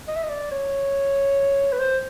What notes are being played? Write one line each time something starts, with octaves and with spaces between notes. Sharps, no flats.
D#5
E5
D#5
D5
C#5
B4
C5